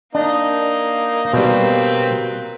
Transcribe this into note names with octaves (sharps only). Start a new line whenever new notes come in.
A#3 D4 D#4
B2 G3 C4 B4